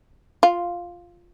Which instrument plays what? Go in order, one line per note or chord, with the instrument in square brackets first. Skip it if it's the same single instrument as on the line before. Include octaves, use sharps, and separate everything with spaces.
[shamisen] F4